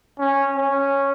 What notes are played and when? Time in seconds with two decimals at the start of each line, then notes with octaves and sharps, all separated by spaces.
0.19 C#4
0.56 C#4